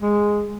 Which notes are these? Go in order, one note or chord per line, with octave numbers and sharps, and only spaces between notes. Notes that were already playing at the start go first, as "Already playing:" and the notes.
G#3